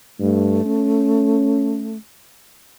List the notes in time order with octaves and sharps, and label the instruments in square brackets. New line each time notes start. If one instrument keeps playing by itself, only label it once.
[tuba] G2 [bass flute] A3
[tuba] C#4